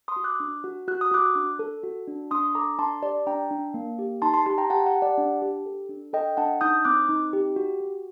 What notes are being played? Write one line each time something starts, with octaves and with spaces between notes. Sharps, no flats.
C6 D#6
F#4
D6 F#6
D4
F#4
F#4 F#6
D#6
F#4 D6 F#6
D4
A4
F#4
D4
D4 C6 D#6
A4 A#5 D6
D4 A5 C6
G4 D5
D4 G5 A#5
D4
A#3
G4
D#4 A5 C6
A5 C6
G4 A5 C6
G5 A#5
G4 F#5 A5
F#5 A5
G4
D5 F#5
D4
G4
A4
D4
A4 D#5 G5
D4 F#5 A5
D#4 D#6 G6
C4 D6 F#6
D#4
G4
F#4
F#4